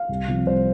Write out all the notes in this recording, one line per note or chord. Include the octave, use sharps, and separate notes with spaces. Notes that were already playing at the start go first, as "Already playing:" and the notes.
Already playing: F5
C2
C3 F3 C4
C2 C5